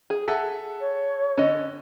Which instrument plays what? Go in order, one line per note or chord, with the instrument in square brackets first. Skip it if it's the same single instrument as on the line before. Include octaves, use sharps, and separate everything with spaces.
[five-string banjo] G#4
[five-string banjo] G#4 [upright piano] A4 E5 F#5
[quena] C#5
[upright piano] D3 [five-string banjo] C#4 D#5